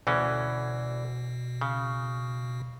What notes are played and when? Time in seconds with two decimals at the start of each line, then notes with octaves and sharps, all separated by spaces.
0.07 D2 B2 E3 C#4
1.61 C#3